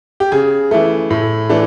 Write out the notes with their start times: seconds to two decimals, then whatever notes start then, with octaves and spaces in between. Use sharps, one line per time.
0.20 G4
0.32 C#3 G#4
0.71 E3 A3
1.10 A2
1.49 E3 A3 D4